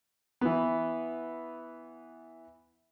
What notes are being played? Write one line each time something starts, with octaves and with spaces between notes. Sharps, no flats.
E3 B3